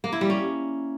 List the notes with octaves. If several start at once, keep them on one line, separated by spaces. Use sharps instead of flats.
A#3
E4
G3
C#4